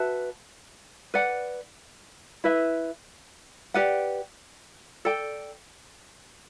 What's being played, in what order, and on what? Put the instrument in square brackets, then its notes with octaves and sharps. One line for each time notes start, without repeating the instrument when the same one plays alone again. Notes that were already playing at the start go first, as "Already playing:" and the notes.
Already playing: [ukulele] F#4 B4 E5 A5
B4 D5 F#5
E4 B4 E5
G4 B4 D5 F#5
A4 D5 G5